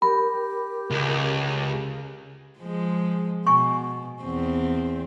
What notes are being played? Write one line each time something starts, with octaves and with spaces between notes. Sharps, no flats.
G4 A#4 B5
C#2
F3 G#3
B2 G#5 C#6
E2 C4